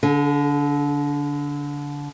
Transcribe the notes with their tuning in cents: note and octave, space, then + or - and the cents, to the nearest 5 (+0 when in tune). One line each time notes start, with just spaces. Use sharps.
D3 -25 G#4 +30